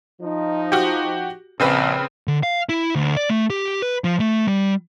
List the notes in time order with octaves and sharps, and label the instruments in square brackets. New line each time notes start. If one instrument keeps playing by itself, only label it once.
[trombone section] F3 D#4
[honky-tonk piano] F#4 G4
[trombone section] A#1 [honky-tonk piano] C#3 C4 B4
[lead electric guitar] D3
F5
E4
D2
D5
A3
G4
B4
F3
A3
G3